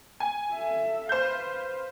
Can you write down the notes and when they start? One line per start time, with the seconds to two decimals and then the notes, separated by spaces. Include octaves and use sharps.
0.20 G#5
0.53 A4 E5
1.09 B4 C5 F5 G6